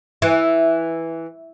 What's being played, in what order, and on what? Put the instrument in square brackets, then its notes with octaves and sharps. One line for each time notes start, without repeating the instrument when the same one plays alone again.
[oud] E3